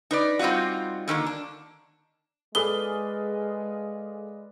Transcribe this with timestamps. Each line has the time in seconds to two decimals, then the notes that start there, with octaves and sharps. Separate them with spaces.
0.11 D#4 B4 D5
0.39 G3 C4 D#4 F4 F#4
1.08 D3 D#3 G#3 A#3
1.26 D4
2.55 G#3 G#4 A4 B4 D5 F5 D#6 G7